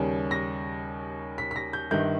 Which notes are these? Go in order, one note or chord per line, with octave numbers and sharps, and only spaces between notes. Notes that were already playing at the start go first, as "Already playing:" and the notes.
Already playing: D#2 C#3 G3 C#4
A#6
B6
B6
A#6
G6
G1 G2 D#3 G6